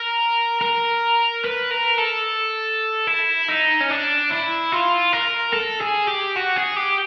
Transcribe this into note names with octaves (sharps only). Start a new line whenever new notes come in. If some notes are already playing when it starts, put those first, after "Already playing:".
Already playing: A#4
A#4
B4
A#4
A4
E4
D#4
C#4
D4
E4
F4
A#4
A4
G#4
G4
F#4
G#4
G4